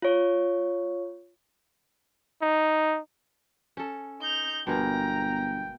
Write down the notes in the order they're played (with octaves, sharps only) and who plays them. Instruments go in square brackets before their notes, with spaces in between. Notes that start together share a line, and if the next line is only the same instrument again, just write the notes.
[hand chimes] F4 C#5
[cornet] D#4
[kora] C#4 A4
[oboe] D#4 [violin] G6 F7
[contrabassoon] G1 [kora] B2 G#3 A#3 [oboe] G5 [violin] A#5